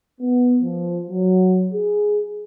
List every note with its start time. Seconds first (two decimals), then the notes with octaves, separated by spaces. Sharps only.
0.20 B3
0.61 F3
1.09 F#3
1.72 G#4